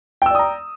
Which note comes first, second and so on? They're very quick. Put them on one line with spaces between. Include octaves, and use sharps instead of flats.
G5 E6 D5 D#6 A#5